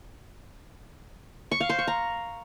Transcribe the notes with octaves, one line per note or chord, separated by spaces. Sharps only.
C#6
F5
C5
C#6
A#5